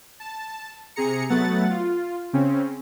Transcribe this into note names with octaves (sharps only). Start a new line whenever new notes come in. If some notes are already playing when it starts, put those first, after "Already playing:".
A5
C3 G#4 A#5 C#7
F#3 A3 B3 F#5 A6
F4
C#3 C4 C#4